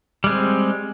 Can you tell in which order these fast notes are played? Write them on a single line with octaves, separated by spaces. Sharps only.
G3 G#3 C4